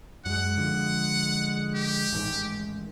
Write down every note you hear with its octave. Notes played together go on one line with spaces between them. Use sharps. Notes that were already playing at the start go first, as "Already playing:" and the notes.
F#2 G#3 F#5
D3 F3
G4
A1 G#2 D#3